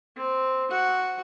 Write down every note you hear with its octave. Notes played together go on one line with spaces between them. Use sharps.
C4
F#4 F#5